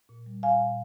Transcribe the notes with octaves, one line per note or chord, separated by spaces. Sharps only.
A#2
G3
A#2 F5 G#5
A#2